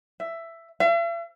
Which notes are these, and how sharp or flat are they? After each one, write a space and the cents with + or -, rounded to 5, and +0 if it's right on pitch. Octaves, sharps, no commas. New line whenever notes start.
E5 +10
E5 +45